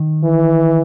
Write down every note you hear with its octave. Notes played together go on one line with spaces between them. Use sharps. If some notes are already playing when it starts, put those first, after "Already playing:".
Already playing: D#3
E3